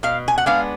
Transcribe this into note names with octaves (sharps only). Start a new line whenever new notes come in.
B2 F5
G#5
F#5
G#3 B3 D4 F5